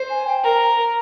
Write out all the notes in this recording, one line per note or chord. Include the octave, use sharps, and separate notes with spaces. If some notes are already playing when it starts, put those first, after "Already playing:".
Already playing: C5
G#5
G5
A#4 A#5